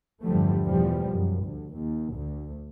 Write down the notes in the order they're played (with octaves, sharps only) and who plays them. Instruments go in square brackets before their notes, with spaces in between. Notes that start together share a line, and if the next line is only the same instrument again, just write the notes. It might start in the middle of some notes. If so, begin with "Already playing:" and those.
[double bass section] E2 G2 D3 F3 G3 A3
E2 B2 F3 G3
F#2
D2
D#2
D2